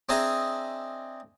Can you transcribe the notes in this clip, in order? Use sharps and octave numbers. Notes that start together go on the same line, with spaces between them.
C4 D4 G#4 D#5 E5 A#5